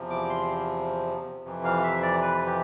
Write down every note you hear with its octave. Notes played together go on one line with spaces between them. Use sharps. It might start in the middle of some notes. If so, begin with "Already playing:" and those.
Already playing: E2 C3 F3
D6
C6
F2 C3 E3
F5
E5
D5
B4
G4